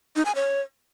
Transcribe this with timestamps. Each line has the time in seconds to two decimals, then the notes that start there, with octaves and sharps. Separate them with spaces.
0.16 D#4
0.25 G#5
0.35 C#5